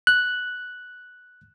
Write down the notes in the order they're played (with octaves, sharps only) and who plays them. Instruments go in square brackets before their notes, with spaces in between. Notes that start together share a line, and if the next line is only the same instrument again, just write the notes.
[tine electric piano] F#6